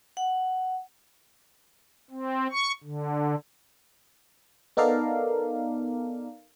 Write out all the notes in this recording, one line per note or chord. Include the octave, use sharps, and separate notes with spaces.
F#5
C4
C#6
D3
B3 D#4 A4 A#4 D5 F5